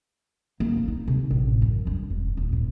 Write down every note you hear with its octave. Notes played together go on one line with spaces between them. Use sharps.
A#3
B1
D#4
C3
A1
F#2
G2
E1
D#1
A#2